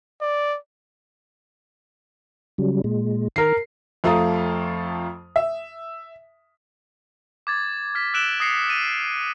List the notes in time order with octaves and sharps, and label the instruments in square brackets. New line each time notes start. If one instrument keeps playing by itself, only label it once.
[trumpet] D5
[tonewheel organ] C#3 F#3 G3
A#2 G#3
[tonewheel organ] D#3 [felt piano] A#4 C7
[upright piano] F2 F3 A3 F4 A#5 D#6
E5
[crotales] D6 G#6 A6
F6 G#6 B6
E6 F#6 D7 E7 F#7 G7
D#6 A#6 C7 C#7
A6 D#7